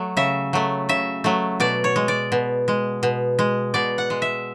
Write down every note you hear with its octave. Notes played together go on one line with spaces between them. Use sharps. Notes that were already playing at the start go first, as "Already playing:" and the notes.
Already playing: F#3 A3
C#3 E5
F#3 A3
C#3 E5
F#3 A3
B2 D5
C#5
G#3
D5
B2
G#3
B2
G#3
B2 D5
F#5
G#3
E5